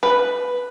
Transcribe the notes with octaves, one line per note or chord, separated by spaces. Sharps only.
B4